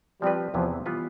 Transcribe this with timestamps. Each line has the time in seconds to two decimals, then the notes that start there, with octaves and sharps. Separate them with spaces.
0.22 F3 G3 C4 G4 B4
0.54 E2 C3 E3 F3 B3
0.86 E3 G3 B3 F4 B4